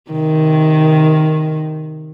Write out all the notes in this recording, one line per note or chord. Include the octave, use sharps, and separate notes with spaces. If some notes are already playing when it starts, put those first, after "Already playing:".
C3 D#3